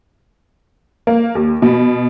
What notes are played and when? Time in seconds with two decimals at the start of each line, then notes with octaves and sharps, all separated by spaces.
1.07 A#3
1.35 D#2
1.62 B2